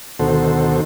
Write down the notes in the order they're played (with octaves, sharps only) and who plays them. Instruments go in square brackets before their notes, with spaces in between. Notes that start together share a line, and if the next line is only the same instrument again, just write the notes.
[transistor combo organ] D2 B2 D#3 F#4 A4 C5